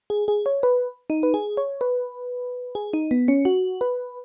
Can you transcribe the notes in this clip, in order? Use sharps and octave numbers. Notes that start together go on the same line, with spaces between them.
G#4
G#4
C#5
B4
D#4
B4
G#4
C#5
B4
G#4
D#4
B3
C#4
F#4
B4